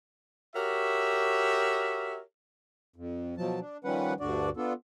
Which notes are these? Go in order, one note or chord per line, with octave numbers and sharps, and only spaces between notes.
F#4 G4 A#4 C#5 E5
F2
B2 F3 F#3 A5
D4
D#3 F3 G3 C#4 B4 F#5
D2 G2 D3 D4 F#4 D5
B3 D4 F4 A4